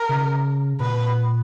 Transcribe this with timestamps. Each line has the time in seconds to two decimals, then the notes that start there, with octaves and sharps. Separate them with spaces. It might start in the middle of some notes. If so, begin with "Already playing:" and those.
Already playing: A#4
0.09 C#3
0.80 A#2 B4